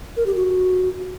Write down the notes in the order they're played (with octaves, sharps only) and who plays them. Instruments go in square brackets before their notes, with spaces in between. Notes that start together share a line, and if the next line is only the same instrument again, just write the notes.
[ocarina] A#4
G4
F#4